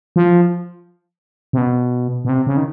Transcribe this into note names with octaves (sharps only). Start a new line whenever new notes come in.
F3
C3
B2
B2
C3
C#3
D#3